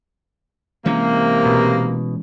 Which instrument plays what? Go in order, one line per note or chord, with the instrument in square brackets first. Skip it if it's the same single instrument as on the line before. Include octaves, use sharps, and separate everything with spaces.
[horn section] C3 A#3 [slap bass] E3 G#3 C#4
[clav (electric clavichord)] B2